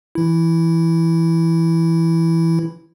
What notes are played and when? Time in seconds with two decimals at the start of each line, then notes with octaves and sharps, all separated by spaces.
0.15 E3 E4